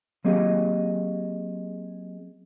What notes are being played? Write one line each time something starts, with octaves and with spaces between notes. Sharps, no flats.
F#3 A#3 C4 G4 G#4 D#5